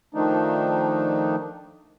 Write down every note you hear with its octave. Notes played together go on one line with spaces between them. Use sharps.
D#3 F3 A3 D4 D#4